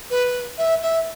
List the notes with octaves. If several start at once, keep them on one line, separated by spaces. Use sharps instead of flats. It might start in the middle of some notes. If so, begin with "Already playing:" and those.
B4
E5
E5